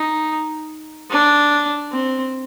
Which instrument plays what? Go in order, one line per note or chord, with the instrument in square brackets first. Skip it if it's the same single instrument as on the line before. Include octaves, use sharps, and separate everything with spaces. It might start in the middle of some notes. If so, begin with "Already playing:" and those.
Already playing: [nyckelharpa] D#4
D4
C4